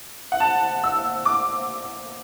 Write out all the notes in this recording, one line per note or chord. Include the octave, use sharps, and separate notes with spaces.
F#5
A5
E6
D6